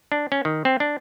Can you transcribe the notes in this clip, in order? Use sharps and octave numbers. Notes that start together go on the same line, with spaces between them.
D4
C#4
D#3
C4
D4